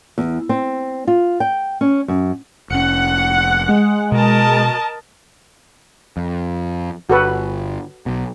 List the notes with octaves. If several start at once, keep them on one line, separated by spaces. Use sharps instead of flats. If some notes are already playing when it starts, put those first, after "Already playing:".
E2
C4
F4
G5
C#4
F#2
F1 C#4 F#5 C#7
G#3
B2 A#4 D#5 A5
F2
G1 F#4 A4 B4
B1 B2